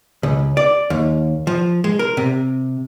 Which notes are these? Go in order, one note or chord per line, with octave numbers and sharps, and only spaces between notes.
C#2
D5
D#2
F3
G#3
A#4
C3